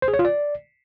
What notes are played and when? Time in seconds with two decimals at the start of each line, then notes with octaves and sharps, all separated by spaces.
0.02 C5
0.08 G#4
0.14 C#5
0.19 F4
0.25 D5